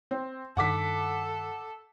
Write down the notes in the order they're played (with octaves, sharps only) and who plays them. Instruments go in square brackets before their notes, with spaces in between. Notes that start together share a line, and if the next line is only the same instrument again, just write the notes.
[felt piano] C4
[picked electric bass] G2 D#3 [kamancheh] A4 [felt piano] F#5 D6 B6